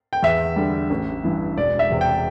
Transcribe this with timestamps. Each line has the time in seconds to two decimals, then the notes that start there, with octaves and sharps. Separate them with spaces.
0.13 G5
0.23 E2 E5
0.56 D3 G3
0.90 A1
1.24 G2 E3
1.57 E1 D5
1.79 E5
1.91 E2 C3
2.01 G5